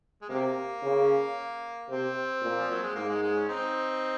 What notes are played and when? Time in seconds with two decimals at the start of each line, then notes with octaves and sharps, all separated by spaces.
0.22 G#3
0.29 C3 A#3
0.83 C#3
1.89 C3 C4
2.42 A#2
2.59 F3
2.70 F#3
2.83 G#3
2.95 G#2 A#3
3.09 G#3
3.23 G#3
3.35 C#4
3.48 C4 D#4